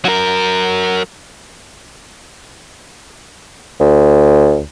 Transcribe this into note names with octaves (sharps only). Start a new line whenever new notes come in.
F#3 A#4
D2